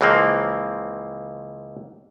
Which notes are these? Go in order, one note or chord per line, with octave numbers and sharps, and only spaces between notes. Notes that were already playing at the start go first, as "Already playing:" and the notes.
C#2 E3 F3 A#3 C4